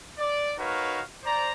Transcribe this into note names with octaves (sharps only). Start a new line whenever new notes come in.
D5
D#4 F#4 A#4 B4 C#5 F5
C5 D5 A#5